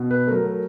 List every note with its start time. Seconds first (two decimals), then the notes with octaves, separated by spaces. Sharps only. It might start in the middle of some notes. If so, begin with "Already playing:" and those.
Already playing: B2
0.11 B4
0.27 F#3 A3 A#4
0.46 A#4